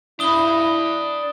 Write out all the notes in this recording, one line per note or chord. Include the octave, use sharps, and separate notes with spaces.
D4 E4 B5 D#6 G7